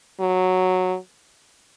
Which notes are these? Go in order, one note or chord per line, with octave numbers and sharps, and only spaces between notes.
F#3